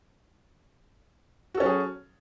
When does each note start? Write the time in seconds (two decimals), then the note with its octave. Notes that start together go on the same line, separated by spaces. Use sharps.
1.54 F#4
1.57 A4
1.60 C#4
1.63 F#3
1.66 G#4